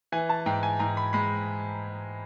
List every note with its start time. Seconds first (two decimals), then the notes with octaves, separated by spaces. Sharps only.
0.12 E3 G#5
0.29 A5
0.46 G#2 G5
0.63 G#5
0.79 G#2 A#5
0.97 B5
1.13 G#3 B5